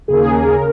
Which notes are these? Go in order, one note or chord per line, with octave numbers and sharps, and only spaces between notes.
D#2 C#3 A#3 G#4
A#4
C#3